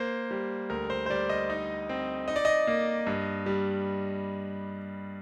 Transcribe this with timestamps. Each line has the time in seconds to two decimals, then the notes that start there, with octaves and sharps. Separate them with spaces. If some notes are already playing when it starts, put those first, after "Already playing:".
Already playing: A#3 C5
0.31 G3
0.70 D2 A#4
0.90 C5
1.06 C5
1.10 G3 D5
1.29 D#5
1.50 D#4
1.89 C4
2.28 D#4 D#5
2.36 D5
2.45 D#5
2.67 A#3
3.07 G2
3.46 G3